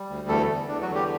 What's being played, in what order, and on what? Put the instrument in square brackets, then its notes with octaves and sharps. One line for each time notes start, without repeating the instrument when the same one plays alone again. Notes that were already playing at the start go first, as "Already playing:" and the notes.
Already playing: [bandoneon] G3
D2
E2 A3 A4
E2
E2 D4
F#3 F#4
D3
G3 G4